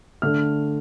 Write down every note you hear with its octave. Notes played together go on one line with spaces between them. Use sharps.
D3 A3 F6